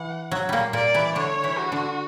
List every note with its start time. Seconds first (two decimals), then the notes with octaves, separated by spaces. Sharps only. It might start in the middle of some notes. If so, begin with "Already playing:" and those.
Already playing: E3 F#5
0.31 F#3
0.49 A#2 G3 A#3
0.73 A#2 A#3 D5
0.94 E3 E4
1.15 D3 D4 C#5
1.43 E3 E4
1.58 F#4
1.72 D3 D4